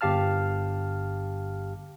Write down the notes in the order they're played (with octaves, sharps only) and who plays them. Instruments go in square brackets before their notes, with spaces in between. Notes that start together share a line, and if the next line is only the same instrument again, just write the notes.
[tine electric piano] G1 G4 F5 A5 F6